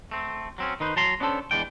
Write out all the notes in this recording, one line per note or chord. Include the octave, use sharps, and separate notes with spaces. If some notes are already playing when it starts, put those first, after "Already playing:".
A3 C4
F#3 C4 C#4
D#3 D#4 B4 C5
F#3 A5 A#5 C6
B3 C#4 D4 F#4 A4 C5
E2 C3 E3 G#3 D4 G5